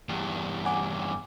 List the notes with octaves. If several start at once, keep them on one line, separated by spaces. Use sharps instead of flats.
E2 G2
F#5 G#5 D6